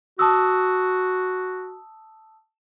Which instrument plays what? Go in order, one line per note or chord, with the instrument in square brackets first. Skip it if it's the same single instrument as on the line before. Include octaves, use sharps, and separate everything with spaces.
[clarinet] F#4 [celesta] A5 D#6 E6